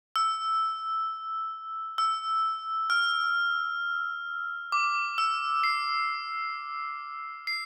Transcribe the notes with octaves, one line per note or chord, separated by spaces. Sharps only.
E6
E6
F6
D6
E6
C7
C7